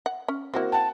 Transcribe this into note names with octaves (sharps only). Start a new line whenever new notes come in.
F#5
C#4
A#3 C4 E4 F#4 A#4
F#5 G5 A5